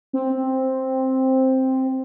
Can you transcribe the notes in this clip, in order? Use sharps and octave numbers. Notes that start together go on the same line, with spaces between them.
C4